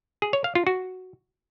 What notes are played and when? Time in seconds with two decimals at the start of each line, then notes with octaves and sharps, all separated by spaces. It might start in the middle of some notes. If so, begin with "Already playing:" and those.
0.22 G#4
0.33 C#5
0.44 F5
0.55 F4
0.67 F#4